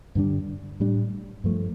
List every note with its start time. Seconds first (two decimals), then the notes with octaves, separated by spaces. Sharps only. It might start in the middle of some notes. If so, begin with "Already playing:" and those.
0.15 G2 D3 G3 D4
0.80 A2 G3 D4
1.44 G2 F3 A3